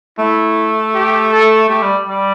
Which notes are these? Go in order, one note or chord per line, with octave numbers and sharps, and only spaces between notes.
A3 E4
G4
A4
A3 G4
G3
G3